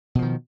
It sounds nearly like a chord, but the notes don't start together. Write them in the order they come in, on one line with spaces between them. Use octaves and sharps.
B2 F3 D#3